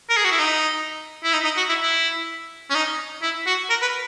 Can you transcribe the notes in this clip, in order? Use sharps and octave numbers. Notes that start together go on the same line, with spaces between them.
A#4
G#4
F#4
E4
D#4
E4
D#4
D#4
F#4
E4
E4
C#4
D#4
E4
F#4
A#4
B4